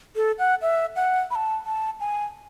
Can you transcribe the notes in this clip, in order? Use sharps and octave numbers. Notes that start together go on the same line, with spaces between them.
A4
F#5
E5
F#5
B5
A5
A5
G#5